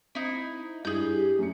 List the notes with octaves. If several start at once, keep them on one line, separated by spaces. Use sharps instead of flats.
C4 D#4 E4
G2 E4 G#4 G6
G4
F#2 A3 C#7